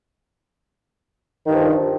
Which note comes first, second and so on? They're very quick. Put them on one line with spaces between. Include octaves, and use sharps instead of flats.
D#3 G2 F3